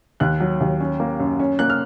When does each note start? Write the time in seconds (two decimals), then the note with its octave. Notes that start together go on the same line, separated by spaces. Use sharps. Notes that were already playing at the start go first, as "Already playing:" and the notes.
0.20 D#2 F#6
0.40 F#3
0.60 D#2
0.80 C#4
1.00 A#3
1.20 F#2
1.39 C#4
1.59 A#3 F#6
1.70 F6